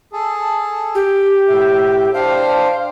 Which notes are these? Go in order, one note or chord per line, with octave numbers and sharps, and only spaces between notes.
G#4 A4
G4
A2 E5
D4 C5 F5 G5